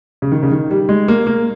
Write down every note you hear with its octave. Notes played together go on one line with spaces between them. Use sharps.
C#3
D#3
C#3
D#3
G3
G#3
A#3
A#3